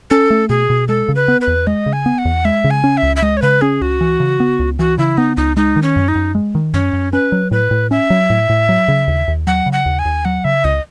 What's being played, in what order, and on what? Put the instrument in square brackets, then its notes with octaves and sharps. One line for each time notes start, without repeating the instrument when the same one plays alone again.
[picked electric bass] C#4 [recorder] A4
[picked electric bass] A3
[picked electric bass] B2 [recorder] G#4
[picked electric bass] B2
[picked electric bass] G#3 [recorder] A4
[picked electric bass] C#3
[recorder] B4
[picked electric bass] B3
[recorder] B4
[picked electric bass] E2
[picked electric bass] G#3 [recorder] D#5
[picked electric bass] C#3
[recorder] G#5
[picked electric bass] B3
[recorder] F#5
[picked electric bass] E2
[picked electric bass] G#3 [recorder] E5
[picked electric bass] C#3
[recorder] G#5
[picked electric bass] C#4
[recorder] E5
[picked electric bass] C#2
[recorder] E5
[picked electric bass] G#3 [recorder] D#5
[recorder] C#5
[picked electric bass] C#3 [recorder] B4
[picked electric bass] C#4 [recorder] G#4
[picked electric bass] C#2 [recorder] F#4
[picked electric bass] E3
C#3
B3
C#2
[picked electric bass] E3 [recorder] F#4
[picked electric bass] C#3 [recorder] E4
[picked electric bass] B3 [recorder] D#4
[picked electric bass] C#2 [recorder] D#4
[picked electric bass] G#3 [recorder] D#4
[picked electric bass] D#3
[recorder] C#4
[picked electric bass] F#2
[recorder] D#4
[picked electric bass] F#2
G#3
D#3
[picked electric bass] F#2 [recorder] C#4
[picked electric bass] F#2
[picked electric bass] C#4 [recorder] B4
[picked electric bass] F#3
[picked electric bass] A2 [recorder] B4
[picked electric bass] A2
[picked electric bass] C#4 [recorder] E5
[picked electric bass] F#3
A2
A2
F#3
C#3
D#2
D#2
[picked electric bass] F#3 [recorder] F#5
[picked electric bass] C#3
[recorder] F#5
[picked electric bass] D#2
[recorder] G#5
[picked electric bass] D#2
[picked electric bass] F#3 [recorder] F#5
[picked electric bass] C#3 [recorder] E5
[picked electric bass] C#2 [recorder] D#5